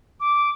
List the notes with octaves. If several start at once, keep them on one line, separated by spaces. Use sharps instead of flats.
D6